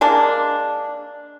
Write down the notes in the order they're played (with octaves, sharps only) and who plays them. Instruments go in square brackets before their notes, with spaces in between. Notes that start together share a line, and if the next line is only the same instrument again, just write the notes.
[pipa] G#3 A#3 D4